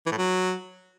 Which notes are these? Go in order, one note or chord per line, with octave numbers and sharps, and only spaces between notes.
E3
A2
F#3